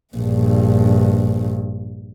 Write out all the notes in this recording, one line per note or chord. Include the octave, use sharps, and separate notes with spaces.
A#1 G2